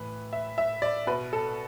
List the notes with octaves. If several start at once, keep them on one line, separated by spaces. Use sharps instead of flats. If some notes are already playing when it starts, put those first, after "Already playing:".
Already playing: A2 E3 B4
E5
E5
D5
B2 B4
A4